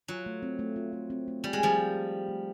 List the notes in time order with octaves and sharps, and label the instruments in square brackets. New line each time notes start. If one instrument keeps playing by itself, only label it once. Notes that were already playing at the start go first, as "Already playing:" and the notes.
[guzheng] F#3 [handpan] F4
[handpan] A3
C4
A3
F4
A3
C4
A3
[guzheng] G3 [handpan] F4
[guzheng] G#3
[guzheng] F3 G3 [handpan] A3
[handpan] C4
A3
F4
A3